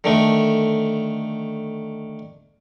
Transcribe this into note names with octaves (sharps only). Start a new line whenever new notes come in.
D3 D#3 A3